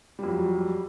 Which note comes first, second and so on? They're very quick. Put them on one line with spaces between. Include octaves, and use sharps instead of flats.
G3 F2 F#3